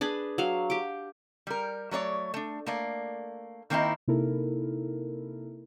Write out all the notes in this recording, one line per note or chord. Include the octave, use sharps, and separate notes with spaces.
D4 G#4 B4
F#3 F5
G4 G5
G3 A#4
F#3 A3 C#5 D5
A3 D4
A3 A#3 D5
D#3 A#3 C4 D#4 E4
C3 A#3 D#4 E4 A4 A#4